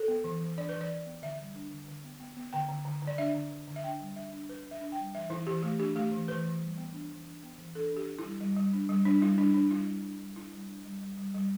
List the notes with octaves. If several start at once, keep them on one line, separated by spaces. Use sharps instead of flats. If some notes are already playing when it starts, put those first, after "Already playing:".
Already playing: A4
B3
E3
E3
D4 D5
E3 B4
D5
E3
B3
D3 E5
G3
D4
D3
D3
B3
B3
B3
D3 G5
D3
D3
D3
D5
D4 E5
D3
D3
D3
E5
D4 G5
G3
D4 E5
D4
D4 B4
D4
E5
D4
G5
G3
E3 E5
E3 E4
E3 G4
A3 G4
D4 G4
A3 G4
E3
E3 B4
E3
G3
B3
D4
E3
D4
B3
E3
D4 A4
D4 G4
D4
E4
G3
G3
G3
D4
G3
G3 D4
G3 E4
G3 D4
D4
G3 E4
G3
D4
G3
D4 E4
G3
D4
G3
G3
G3
G3